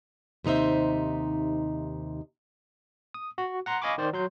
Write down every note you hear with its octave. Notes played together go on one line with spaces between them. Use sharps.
D#2 C3 D#4 C5 E5
D#6
F#4
F#5 A#5 C6
D#5 F5 G#5 B5 C#6 D6
D#3 C5 D5
F#3 C6 G6